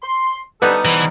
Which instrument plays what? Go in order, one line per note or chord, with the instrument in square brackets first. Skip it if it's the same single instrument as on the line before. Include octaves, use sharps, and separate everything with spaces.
[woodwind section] C6
[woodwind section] D3 C4 A4 [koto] G3 B3 D#4 [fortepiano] B4
[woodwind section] G#2 B2 [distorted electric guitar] E3